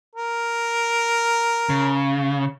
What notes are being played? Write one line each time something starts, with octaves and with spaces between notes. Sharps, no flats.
A#4
C#3